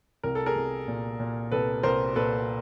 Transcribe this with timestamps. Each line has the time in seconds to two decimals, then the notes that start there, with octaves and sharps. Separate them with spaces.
0.23 C2 A#4
0.35 A4
0.46 G#4 A#4
0.56 C2
0.88 A#2
1.20 A#2
1.52 C2 A4 B4
1.83 C2 A#4 C5
2.16 A#2 A4 B4